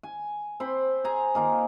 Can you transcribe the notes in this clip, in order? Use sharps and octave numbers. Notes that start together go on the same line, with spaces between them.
G#5
C4 C5 B5
G#4 G#5 A#5
D#3 A#3 F4